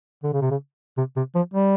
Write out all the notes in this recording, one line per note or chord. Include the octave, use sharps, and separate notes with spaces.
D3
C#3
C3
C#3
C3
C3
F3
G3